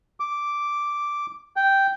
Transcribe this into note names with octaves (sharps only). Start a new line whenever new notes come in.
D6
G5